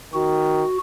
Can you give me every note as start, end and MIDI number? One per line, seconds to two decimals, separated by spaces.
0.13 0.62 51
0.13 0.78 66